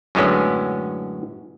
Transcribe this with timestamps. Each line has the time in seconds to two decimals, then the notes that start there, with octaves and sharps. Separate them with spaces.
0.15 F#2 A2 D3 G#3 B3 C#4